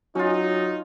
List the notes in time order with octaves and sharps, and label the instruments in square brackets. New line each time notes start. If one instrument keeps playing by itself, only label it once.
[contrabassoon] F#3 [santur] C#4 F4 [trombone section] D#4